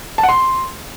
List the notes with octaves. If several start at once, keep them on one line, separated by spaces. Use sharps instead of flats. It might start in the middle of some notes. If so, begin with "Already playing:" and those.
A5
F#5
C6